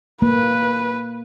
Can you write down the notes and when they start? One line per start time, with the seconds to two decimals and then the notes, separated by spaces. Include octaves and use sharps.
0.22 A#3 B4